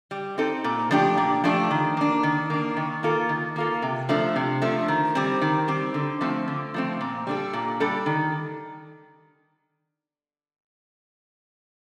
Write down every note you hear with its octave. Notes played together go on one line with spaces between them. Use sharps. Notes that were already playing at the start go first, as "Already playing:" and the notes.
G3
C4 D#4 A4
A#2
F3 A3 D4 G4
A#2
F3 A3 D4 G4
D#3
A#3 D4
D#3
A#3 D4
D#3
A#3 F4 A4
D#3
A#3 F4 A4
C3
F3 A3 D4
C3
F3 A3 D4
D#3
G3 C4
D#3
G3 C4
D3
F3 A3 C4
D3
F3 A3 C4
A#2
G3 D4 A4
A#2
G3 D4 A4
D#3